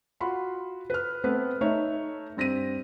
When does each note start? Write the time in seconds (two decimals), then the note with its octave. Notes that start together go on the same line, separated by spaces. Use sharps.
0.20 F4 F#4 B5 C6
0.90 B4 F6
1.24 A3 B3 C4 B4
1.61 A3 D#4 C#5 E5
2.37 G2 C4 A#6 B6 D#7